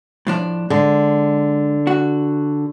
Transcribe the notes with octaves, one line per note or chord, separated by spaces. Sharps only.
A2 F3 D4
D3 G#3
F#4